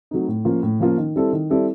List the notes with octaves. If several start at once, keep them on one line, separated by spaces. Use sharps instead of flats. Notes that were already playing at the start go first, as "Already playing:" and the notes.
F#3 A3 C4 D#4
A2
F3 A#3 C#4 F4
A2
F3 A#3 C#4 F4
D#3
G3 C4 E4 A4
D#3
G3 C4 E4 A4